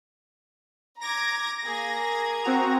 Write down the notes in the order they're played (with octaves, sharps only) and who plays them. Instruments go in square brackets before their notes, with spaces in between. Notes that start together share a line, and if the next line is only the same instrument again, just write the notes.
[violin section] A#5 D6 G#6 [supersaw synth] A#6
[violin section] A#3 G#4 G#6
[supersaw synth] C4 F#4 A#5